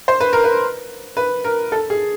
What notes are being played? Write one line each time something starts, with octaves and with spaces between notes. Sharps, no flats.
C5
B4
A#4
B4
B4
A#4
A4
G#4